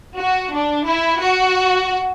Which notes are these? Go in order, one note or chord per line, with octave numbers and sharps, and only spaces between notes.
F#4
D4
E4
F#4